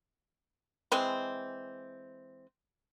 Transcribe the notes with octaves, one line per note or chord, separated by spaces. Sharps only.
E3 G#3 C4